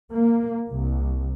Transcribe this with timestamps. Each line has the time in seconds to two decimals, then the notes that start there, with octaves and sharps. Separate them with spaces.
0.11 A#3
0.67 C2